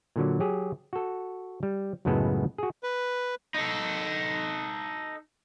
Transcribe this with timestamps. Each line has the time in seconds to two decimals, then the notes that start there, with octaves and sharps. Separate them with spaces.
0.16 A#2 D3 F#3
0.40 F#3 G4 G#4
0.93 F#4 A4
1.63 G3
2.05 C#2 F#2 A2 G#3 B3 A4
2.58 F#4 G#4
2.83 B4
3.54 D#4 A4